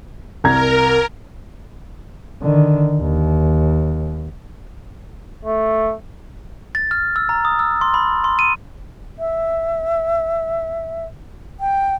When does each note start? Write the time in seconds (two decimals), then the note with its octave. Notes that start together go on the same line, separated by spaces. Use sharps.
0.44 C2 A#4 A#5 G#6
2.42 D3 D#3
3.01 D#2
5.45 A3
6.75 A6
6.91 F6
7.16 E6
7.29 A#5
7.45 D#6
7.59 E6
7.81 C6
7.94 B5
8.24 C6
8.39 D#7
9.19 E5
11.60 G5